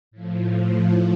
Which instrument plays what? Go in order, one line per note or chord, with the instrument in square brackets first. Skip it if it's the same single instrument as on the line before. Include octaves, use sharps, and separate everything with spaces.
[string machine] A2 F3